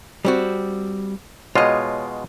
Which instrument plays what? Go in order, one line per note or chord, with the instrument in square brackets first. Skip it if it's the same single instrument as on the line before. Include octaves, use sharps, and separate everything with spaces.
[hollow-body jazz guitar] G3 C4 F#4
[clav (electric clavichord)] B2 G#3 F4 [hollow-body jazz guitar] C#5 D#5